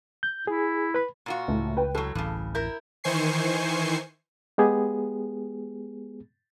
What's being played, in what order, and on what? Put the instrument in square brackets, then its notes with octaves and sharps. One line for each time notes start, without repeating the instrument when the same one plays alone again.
[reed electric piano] G6
[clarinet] E4 [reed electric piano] G#4
[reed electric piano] B4 B5
[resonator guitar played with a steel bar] A#2 F4 F#4
[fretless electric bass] C#2 [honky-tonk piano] A2 A3
[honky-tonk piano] B4 G5
[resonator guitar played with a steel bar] A2 F#3 [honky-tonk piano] A4
[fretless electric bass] D1 A1 E3 [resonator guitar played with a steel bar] G2 C#3
[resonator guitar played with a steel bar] E4 A#4 [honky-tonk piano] G6
[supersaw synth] D#3 E3 C5 G#5 C#6 C7
[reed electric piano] G#3 B3 G4 G#4